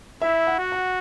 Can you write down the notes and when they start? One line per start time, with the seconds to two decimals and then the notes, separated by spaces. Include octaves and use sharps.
0.22 E4 E5
0.47 F#5
0.59 F#4
0.72 F#5